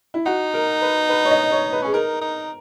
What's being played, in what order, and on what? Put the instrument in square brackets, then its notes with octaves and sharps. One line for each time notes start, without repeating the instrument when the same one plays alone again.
[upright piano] E4
[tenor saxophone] D#4 [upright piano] F#4
[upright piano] A#4
B4
B4
C#5
D#5
C#5
B4
[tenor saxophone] C#4 [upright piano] G#4
[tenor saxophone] D#4 [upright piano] A#4
[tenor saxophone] D#4